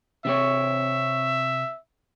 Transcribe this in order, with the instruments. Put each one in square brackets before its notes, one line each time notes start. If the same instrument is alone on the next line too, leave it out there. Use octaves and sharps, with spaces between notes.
[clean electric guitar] C3 C4 C#5 [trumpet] E5